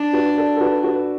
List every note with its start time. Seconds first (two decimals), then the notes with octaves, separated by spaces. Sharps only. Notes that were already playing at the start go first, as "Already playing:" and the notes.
Already playing: D4
0.13 F#4 B4
0.37 A4 D5
0.56 A4
0.61 F#4 B4
0.84 F#4 B4